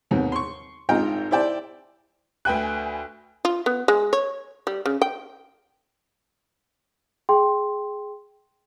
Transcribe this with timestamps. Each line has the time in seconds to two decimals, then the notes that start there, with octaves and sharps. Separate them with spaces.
0.11 D#2 G#2 C3 D#3 B3
0.32 C6 C#6
0.89 G#1 G#2 F4 D#5 G5 A#5
1.31 E4 C5 D5 G5 A5
2.45 D2 B4 G5 G#5 F#6
3.45 F4
3.66 B3
3.88 G#3
4.13 C#5
4.67 G3
4.86 C#3
5.02 G5
7.29 G#4 G5 C6